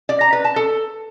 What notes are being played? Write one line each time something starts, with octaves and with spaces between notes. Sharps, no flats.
D5
A#5
B4
A5
A4